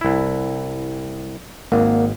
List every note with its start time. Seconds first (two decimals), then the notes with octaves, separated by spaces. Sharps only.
0.01 C2 E4
1.72 G#1 A#3 F#5